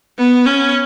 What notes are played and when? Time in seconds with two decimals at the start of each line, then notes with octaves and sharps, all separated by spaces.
0.19 B3
0.46 C#4